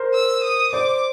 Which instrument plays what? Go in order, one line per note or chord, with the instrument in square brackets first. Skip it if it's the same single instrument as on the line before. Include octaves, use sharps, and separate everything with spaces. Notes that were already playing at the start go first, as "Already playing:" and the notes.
Already playing: [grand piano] A#4 C5
[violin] E6
D#6
[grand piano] C5 D5 [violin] D6